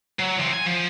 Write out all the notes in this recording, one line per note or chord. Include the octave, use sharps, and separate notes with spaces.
F#3
E3 C4
G#5
F3